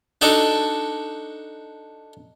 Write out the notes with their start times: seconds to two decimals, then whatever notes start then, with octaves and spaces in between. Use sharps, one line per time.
0.21 D4 D#4 F#4 A4 D5